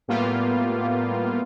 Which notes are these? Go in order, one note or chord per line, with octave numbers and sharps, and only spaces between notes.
A2 G3 A#3 B3 F4